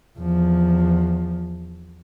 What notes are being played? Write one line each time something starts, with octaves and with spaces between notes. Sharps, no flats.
E2 F3